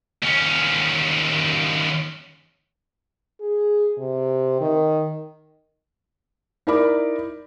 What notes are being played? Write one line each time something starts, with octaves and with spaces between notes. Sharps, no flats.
D#2 C#4
G#4
C3
D#3
D#4 E4 A#4 D5 B5 D6